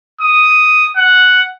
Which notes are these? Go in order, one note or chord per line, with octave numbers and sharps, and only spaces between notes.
D#6
F#5